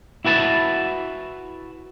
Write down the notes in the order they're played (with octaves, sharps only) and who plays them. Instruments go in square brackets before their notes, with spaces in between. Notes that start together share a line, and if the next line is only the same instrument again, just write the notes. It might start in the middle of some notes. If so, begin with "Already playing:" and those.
[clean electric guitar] E4 F#4 B4 A5